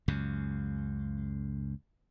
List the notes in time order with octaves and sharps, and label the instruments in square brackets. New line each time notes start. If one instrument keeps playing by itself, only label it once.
[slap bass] C#2 F#2 C#3